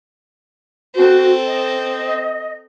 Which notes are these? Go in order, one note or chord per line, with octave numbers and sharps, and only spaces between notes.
C4 F#4 A4
D#5